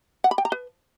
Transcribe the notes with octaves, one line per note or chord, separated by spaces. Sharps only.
F#5
B5
G5
A#5
B4